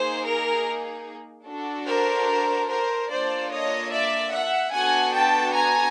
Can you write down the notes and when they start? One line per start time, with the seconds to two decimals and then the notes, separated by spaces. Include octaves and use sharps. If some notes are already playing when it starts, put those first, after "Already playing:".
Already playing: A#3 D#4 G#4 C5
0.24 A#4
1.47 D4 F#4 A4
1.87 A#4 C5
2.69 A#4 C5
3.09 A#3 D4 F4 A4 C5 D5
3.51 C#5 D#5
3.91 D5 E5
4.32 E5 F#5
4.73 B3 D4 F#4 A4 F#5 G#5
5.13 G5 A5
5.54 G#5 A#5